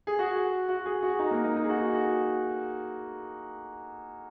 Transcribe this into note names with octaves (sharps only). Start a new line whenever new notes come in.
G#4
F#4
F#4
G#4
F#4
D#4
A#3
D#4
D#4
G#4
F#4
F#4